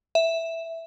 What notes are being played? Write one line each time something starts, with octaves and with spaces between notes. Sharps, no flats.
E5